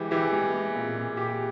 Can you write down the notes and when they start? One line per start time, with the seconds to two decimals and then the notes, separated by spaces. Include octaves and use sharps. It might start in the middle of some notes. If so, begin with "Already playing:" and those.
Already playing: E3 G#3 G4
0.11 E3 G4
0.32 G#3
0.54 G#3
0.75 A#2
0.95 A#2
1.17 G4